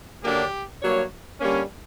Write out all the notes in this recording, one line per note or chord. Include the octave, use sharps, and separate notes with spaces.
F#2 D3 F#3 A#3 D4 G4
G2 F#3 A#3 C#5
D3 G3 A#3 C#4